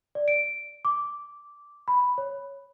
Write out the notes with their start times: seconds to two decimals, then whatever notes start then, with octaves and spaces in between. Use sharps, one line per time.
0.15 D5
0.28 D7
0.85 D6
1.88 B5
2.18 C#5